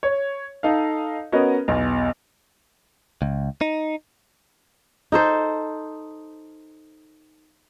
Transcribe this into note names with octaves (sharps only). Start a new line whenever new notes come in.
C#5
D#4 A4 D#5 F5
B3 C#4 F#4 A#4 D#5
B1 E2
C#2
D#4
D#4 A4 C5